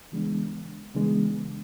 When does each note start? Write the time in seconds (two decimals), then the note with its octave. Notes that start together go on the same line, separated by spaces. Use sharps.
0.12 C#3 E3 G#3 B3 D4
0.95 C#3 E3 G#3 B3 D4